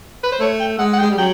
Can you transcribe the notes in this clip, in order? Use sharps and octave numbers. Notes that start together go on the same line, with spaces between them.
B4
C5
A3 C#5
G5
G#3 F#5
F#5
G5
G#3
G3
F#3 G5